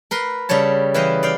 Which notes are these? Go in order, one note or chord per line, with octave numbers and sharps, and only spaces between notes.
A#4 B4 C6
C#3 G3 A4 C#5 A5
E3 E4 B4 D#5 F5 G5
D5 F5 G5